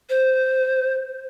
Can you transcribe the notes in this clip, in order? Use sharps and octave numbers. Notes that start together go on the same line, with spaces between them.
C5